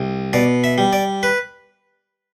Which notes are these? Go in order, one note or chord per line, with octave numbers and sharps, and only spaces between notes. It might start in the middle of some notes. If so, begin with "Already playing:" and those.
Already playing: C2
B2 D5
E5
G3
D5
B4